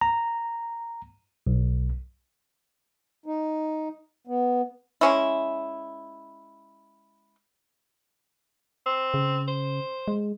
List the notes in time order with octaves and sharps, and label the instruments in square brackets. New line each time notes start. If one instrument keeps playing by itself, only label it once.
[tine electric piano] A#5
B1
[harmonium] D#4
B3
[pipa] G#3 C#4 E4
[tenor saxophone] C4
[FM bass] C#3
[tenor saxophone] C5
[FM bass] G#3